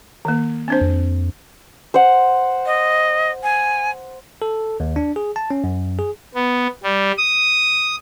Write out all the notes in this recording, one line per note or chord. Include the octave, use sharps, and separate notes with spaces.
D#3 A#3
C4 D4 C5
F2
C5 F#5
D#5
G#5
A4
D#2
D4
G#4
A5
C#4
F#2
G#4
B3
G3
D#6